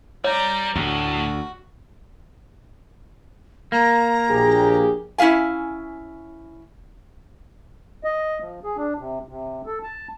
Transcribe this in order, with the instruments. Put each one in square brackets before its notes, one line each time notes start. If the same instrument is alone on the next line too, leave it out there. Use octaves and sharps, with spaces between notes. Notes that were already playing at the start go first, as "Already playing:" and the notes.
[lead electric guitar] G3 [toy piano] C#5 [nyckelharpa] D5 A#5
[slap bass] D2 [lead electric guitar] A2 [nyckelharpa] F#4
[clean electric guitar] A#3 [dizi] A#5
[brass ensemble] A#1 G4 [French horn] G#4
[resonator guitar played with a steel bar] C#4 E4 G#4 F5 G#5
[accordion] D#5
F3
G#4
D4
C3
C3
A4
A5